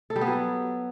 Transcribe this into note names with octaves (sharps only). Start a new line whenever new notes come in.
A4
G3
B3
F#3